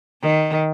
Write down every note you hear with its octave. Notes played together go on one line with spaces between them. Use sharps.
D#3